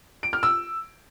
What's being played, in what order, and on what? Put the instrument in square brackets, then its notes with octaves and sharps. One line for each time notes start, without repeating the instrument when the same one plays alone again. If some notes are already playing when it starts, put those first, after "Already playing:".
[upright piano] D7
F6
E6